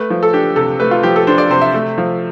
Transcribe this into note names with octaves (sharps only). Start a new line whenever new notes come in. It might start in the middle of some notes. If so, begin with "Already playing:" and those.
Already playing: A3 B4
F3
A4
D4 G4
C3 A4
A3 B4
F4
F3 G4
A4
D4 C5
D5
C3 C5
E5
A3
F3